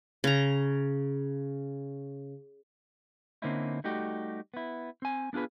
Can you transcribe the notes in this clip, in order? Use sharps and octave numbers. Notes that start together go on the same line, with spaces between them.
C#3 A#5
D3 A#3 C4 C#4 D#4 E4
G3 A3 D#4 F#4 G4
B3 E4
C4 G#5
B3 D4 F4 G#4 B4